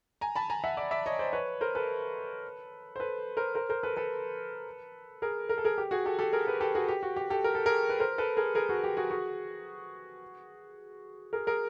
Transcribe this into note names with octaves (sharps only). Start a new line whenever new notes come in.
G#5 A#5
A5 B5
G#5 A#5
E5 F#5
D5 E5
D5 E5
C#5 D#5
C5 D5
B4 C#5
A#4 C5
A4 B4
C5
A4 B4
A#4 C5
A#4 C5
A#4 C5
A4 B4
A4 B4
G#4 A#4
A#4
A4
G#4 A#4
G4
F#4 G#4
G4 A4
G4 A4
G#4 A#4
A4 B4
G4 A4
F#4 G#4
G4
F#4
G4
G4 A4
A#4
A4
G#4 A#4
B4
A#4 C5
A4 B4
G#4 A#4
G#4 A#4
F#4 G#4
G4
F#4 G#4
F#4 G#4
G#4 A#4
G#4 A#4